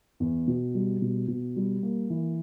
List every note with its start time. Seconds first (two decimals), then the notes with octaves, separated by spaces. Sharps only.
0.20 E2
0.48 B2
0.75 G3
1.02 B2
1.28 B2
1.56 G3
1.83 A#3
2.10 E3